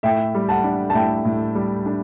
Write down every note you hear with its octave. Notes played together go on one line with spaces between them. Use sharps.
A2 E5 G5
G3
F#5 A5
D4
A5
A2 E5 G5
A2
G3
D4